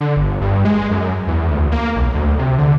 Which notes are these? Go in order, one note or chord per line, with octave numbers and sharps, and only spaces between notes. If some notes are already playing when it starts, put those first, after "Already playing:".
D3
G1
G2
G#3
F#2
E2
D2
A#3
B1
D2
C3
D3